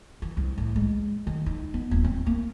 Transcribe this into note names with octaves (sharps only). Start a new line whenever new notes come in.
E3
C2
A2
G#3
D#3
D#4
B3
D#1
C4
A#3